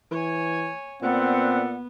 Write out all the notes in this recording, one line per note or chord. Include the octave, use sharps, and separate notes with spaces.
E3 C#5 G#5
A#2 B3 C4 D5 E5 F#5